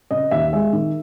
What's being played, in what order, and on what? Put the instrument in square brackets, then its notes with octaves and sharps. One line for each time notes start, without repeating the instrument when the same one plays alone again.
[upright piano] C#3 D#5
D#2 E5
G#3 E5
D#3